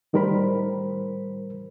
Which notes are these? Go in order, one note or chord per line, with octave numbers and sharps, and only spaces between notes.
A2 D#3 G3 A#4 C5 B5